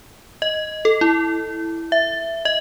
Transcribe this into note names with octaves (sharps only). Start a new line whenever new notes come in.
D#5
A4
E4
E5
D#5